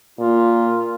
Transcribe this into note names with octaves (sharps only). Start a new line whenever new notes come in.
A#2 F4